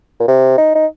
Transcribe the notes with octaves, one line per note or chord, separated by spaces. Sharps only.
A#2
C3
D#4
D#4